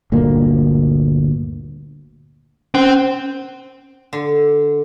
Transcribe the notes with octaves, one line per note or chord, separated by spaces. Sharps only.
G1 D2 A#2 A#3
C4 C#4
D3